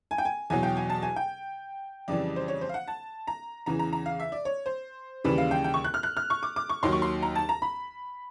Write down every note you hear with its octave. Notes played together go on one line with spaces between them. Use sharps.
G#5
G5
G#5
E2 B2 F#3 G#5
G5
G#5
A5
G#5
G5
F2 C#3 E3 G3 D5
C5
C#5
C5
F5
F#5
A5
A#5
E2 C#3 E3 A#5
A#5
A#5
F5
E5
D5
C#5
C5
D#2 C#3 E3 G3 B4
F5
G5
G5
C#6
F#6
F6
F#6
F6
C#6
D6
D6
C#6
D#2 D#3 F#3 C6
C#6
C6
A#5
A5
A#5
B5